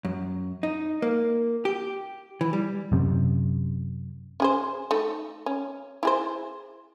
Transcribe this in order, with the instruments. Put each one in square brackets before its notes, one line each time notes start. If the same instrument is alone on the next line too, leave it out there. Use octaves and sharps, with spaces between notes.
[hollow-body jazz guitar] F#2
D#4
A#3
G4
E3
G3
[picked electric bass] F#2 C3
[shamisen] C#4 G#4 C5
A3 D#4
C#4
E4 G#4 C5